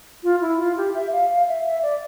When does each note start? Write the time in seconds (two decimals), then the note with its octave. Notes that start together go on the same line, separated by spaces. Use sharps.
0.24 F4
0.42 E4
0.60 F4
0.77 G4
0.95 E5
1.13 F5
1.31 F5
1.48 E5
1.66 E5
1.83 D5